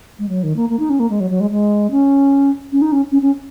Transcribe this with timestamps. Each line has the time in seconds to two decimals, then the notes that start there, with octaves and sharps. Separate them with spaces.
0.19 G#3
0.29 F#3
0.43 D#3
0.56 A#3
0.69 A#3
0.79 D#4
0.90 C#4
1.00 A#3
1.10 G#3
1.20 F#3
1.30 F#3
1.40 G#3
1.51 G#3
1.91 C#4
2.72 C#4
2.82 D#4
2.92 C#4
3.12 C#4
3.22 C#4